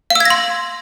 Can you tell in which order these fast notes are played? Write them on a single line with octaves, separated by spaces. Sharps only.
F5 E6 G#6 A#6 C6